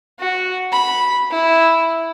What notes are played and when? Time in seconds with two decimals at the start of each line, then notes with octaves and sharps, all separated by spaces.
0.19 F#4
0.72 B5
1.31 E4